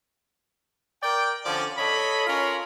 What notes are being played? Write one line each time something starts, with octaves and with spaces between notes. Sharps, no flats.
A#4 D5 G5
D3 F3 C#4 D5
A4 C#5 D#5 B5
C#4 F4 A#4 C#5